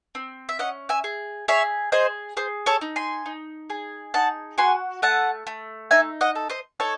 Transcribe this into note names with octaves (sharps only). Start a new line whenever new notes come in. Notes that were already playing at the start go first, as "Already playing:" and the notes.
C4
E5
C#4 D#5 F#5
E5 G#5
G#4
G#4 C#5 E5
G#4 C5 D#5
G#4 C5
A4 C#5
D#4
G#5 C6
D#4
G#4
D#4 F#5 A5
F#4 G#5 C6
A3 F#5 A5
A3
D#4 E5 G#5
D#5 F#5
A4
C5 D#5
D#4 A4 C#5